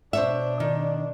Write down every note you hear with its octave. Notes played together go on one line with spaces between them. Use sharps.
B2 D4 C5 C#5 E5
D#3